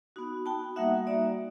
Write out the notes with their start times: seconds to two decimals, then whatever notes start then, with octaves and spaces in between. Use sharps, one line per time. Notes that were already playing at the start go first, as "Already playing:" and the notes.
0.16 B3 D#4 F#4
0.46 B3 D#4 F#4 G5 A5
0.76 G3 A#3 D#4 F#4 E5 F#5
1.07 G3 A#3 D#4 F#4 D5 E5